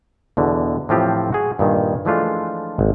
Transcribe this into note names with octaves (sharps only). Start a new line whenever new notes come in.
E2 B2 D3
A2 E3 F3 C4 F4 G4
F#4 G#4
G2 A#2 D#3
E3 F3 G#3 A3 D4 F4
G#1